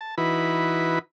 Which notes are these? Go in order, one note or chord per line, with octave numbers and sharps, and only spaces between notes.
A5
E3 D#4 E4 F#4 B4 B5